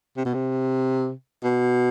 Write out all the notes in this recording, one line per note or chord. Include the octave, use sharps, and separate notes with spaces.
C3
B2
C3
B2